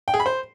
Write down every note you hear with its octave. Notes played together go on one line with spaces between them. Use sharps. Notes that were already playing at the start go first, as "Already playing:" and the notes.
G5
G#4
B5
C5